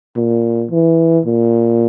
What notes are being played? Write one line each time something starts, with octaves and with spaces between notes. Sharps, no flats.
A#2
E3
A#2